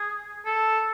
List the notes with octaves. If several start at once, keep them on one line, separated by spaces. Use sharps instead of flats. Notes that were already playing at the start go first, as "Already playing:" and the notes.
Already playing: G#4
A4